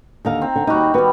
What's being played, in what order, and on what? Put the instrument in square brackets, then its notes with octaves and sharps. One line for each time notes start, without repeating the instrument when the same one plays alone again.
[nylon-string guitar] D#2 D3 F5 [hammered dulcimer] D#4 A#5
[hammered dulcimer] C4
[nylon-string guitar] D3
[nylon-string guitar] D#2 D#4 [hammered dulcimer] G3 F#4
[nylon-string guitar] D#3 F#4 B4 [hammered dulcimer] G3 B3